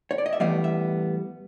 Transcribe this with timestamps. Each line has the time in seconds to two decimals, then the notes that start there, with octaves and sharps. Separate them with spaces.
0.11 C#5
0.18 D5
0.26 D#5
0.33 E5
0.40 A2 E3 G3 B3 F5
0.64 E5